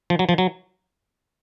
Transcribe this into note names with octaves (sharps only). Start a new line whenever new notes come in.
F3
F#3
F3
F#3